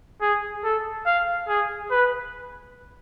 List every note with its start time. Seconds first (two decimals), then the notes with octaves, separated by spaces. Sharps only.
0.22 G#4
0.64 A4
1.06 F5
1.48 G#4
1.91 B4